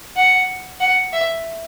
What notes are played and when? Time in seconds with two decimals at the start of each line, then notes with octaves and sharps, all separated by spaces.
0.16 F#5
0.80 F#5
1.13 E5